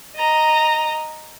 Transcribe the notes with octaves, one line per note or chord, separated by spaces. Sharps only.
D#5 A#5